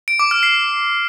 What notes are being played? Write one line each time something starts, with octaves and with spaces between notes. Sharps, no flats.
D7
D6
F6
C7